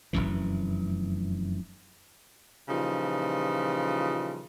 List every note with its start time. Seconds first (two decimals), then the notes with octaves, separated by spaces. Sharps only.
0.13 F1 C#2 F#2 E3
2.69 A#2 C#3 E3 F3 G3 D#4